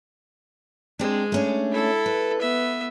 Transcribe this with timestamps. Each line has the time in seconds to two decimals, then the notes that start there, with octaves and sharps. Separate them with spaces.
0.99 G#3 C4 D4
1.32 A3 C#4 D4
1.72 E4 A4
2.06 B4
2.40 B3 E5